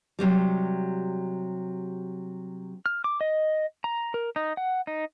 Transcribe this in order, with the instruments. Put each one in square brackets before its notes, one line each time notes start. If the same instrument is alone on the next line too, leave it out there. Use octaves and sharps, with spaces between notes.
[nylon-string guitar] C3 F#3 G3
[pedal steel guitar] F6
D6
D#5
A#5
A#4
D#4
F#5
D#4